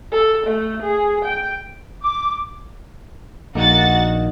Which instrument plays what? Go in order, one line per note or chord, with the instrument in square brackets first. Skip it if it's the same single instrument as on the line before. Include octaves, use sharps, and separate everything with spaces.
[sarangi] A4
A3
G#4
G5
[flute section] D6
[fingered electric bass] A#1 [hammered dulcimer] D#3 A#3 [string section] F#4 F#5 A6